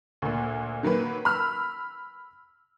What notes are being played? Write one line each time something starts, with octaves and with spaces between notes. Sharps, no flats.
D2 A#2
D#3 F#3 A#3 B4
B5 E6 F6